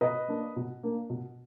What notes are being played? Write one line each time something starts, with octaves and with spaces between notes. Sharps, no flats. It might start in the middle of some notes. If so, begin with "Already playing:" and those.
B2 B4 D#5
A#3 D4
B2
A#3 D4
B2